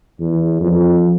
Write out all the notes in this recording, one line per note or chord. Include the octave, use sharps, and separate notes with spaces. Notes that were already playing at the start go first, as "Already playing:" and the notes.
E2
F2